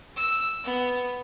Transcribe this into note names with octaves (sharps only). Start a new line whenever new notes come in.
E6
B3